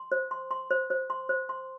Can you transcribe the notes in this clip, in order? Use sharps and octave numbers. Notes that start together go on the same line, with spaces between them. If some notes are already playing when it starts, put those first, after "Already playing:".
Already playing: C6
C5
C6
C6
C5
C5
C6
C5
C6